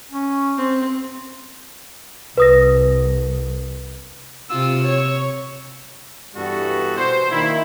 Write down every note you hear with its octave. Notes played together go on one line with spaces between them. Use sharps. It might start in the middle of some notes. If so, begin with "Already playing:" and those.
C#4
C4
C2 B4 D#6 A#6
C3 F4 E6
C#5
G2 E3 G3 B3 F#4 A4
B2 C5
D#3 A#3 D4 E4